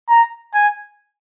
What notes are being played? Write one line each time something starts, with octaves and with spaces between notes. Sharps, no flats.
A#5
G#5